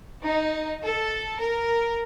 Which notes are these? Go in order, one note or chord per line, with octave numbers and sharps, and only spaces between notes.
D#4
A4
A#4